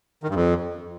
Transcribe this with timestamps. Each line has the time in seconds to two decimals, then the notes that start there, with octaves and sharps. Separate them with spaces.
0.23 D#3
0.29 G2
0.35 F2